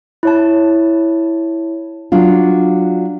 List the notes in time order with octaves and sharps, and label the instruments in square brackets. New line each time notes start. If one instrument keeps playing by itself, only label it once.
[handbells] E4 C#5 A5
[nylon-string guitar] F#3 D4 F4